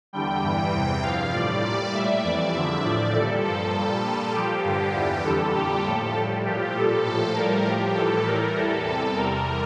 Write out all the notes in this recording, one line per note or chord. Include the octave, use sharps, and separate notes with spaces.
E2 D3 G3 G5
G2 E3 G3
E2 C3 E3
G2 F3 F5
A2 G3 D5
A#2 G3 D5
A2 G3 E5
F2 E3 G3 D5
E2 D3 F3 E5
A2 F3 D5
A#2 G3 A4
G2 F3 A4
A#2 G3
A#2 G3
A#2 F3 G4
G2 D3 F3
E2 E3 G3
F2 D3 G3 A4
A#2 G3 G4
A2 F3 A4
A2 G3
A#2 F3 G4
A#2 G3 A4
A2 F3 A4
A2 G3 A#4
A2 F3 G4
A2 E3 G3 A4
A2 G3 A#4
E2 E3 G3 A4
E2 C3 G3 A4
E2 C3 G3 A#4